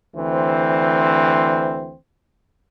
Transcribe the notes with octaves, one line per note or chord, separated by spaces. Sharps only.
D2 E3 C4 C5